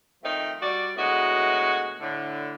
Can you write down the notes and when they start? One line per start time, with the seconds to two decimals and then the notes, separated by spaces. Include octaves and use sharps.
0.23 D#3 F3 A3 C4 D#4
0.61 G3 F#4 D5
0.96 D2 A2 G#3 B3 F#4
2.00 A2 D3